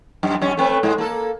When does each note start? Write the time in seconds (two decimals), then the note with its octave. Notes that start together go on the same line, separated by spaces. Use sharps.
0.23 F#2
0.42 F#2 C#4
0.57 A3 C4 B4
0.83 G#2 G#3
0.98 A#3 A4